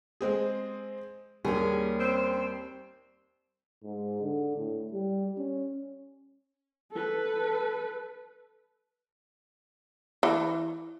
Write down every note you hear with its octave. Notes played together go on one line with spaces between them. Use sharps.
G#3 C4 G#4
D#2 G3 A#3 C#4 G#4
C4
G#2
D3
A2
G3
C#4
A4 B4
E3